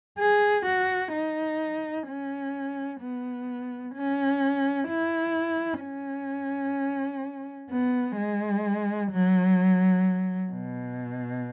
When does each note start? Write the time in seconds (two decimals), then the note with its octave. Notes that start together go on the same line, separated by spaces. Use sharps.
0.20 G#4
0.66 F#4
1.13 D#4
2.07 C#4
3.01 B3
3.95 C#4
4.89 E4
5.83 C#4
7.70 B3
8.18 G#3
9.11 F#3
10.52 B2